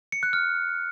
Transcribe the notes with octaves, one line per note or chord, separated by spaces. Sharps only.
C#7
F#6
F6